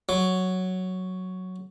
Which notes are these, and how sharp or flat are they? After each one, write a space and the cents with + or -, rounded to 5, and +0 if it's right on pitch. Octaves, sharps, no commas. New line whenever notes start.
F#3 +0